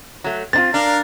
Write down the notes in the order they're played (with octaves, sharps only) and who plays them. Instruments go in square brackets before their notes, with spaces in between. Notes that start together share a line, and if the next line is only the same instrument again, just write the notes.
[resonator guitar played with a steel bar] F#3 A3
[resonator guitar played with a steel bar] C4 D4 F4 [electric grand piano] A6
[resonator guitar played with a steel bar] D4 [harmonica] A#4 F5